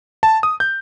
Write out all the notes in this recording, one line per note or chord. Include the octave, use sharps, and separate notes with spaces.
A5
D#6
G6